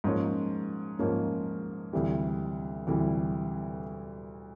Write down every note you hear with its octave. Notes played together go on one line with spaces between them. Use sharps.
G#2 F3 A#3 C#4
G#2 F3 A#3 C#4
D2 C3 E3 G3
D2 C3 E3 G3